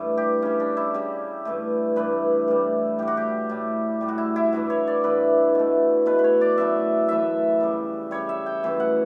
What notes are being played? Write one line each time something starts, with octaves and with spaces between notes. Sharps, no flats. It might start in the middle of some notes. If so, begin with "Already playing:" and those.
Already playing: G2 E3 A3
G4
C#3 G3 C#4
D4
E4
C#3 G3
G2 E3 A3
G2 E3 A3 B4
A2 G3
A2 G3 G4
F#4
G4
A2 G3
A2 G3
F#4
E4
E4
G2 E3 A3 F#4
C#5
D5
G2 E3 A3 B4
B2 A3
B2 A3 B4
B4
C#5
D5
F#2 E3 A3 E5
F#2 E3 A3 E5
C#3 G3
C#3 G3 C#5
E5
G5
F#2 E3 A3
F#5